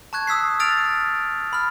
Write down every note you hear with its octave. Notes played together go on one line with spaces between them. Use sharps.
A5 C#6 F#6 G#6
D#6 E6 B6 C7
D#6 F6 A6 D7 F7
B5 F6